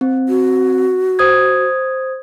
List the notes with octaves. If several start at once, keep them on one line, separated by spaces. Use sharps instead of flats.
C4
F#4
C5 D#6 G#6